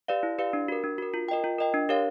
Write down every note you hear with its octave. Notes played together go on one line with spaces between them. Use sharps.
G4 B4 D5 F5
E4
G4 B4 D5 F5
D4
F#4 A#4
D4
F#4 A#4
F4
A#4 D#5 G5
F4
A#4 D#5 G5
D4
G4 A#4 C#5 F5